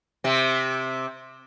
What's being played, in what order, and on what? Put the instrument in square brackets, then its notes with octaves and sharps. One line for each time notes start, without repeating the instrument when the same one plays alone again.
[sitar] C3 C4